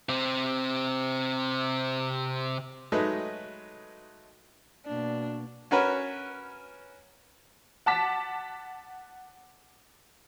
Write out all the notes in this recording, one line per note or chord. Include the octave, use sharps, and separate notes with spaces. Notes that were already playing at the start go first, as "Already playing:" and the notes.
C3 C4
F#3 G#3 A3 D#4 B4
B2 A#3 D4
C#4 F#4 A#4 B4 C#5
F#5 A5 D6 B6